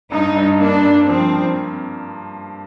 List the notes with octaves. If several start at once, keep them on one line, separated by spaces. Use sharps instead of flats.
G2 D#4
G2
A#3 D4
G2
F3 C4
F3